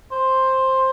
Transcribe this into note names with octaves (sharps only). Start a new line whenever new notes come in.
C5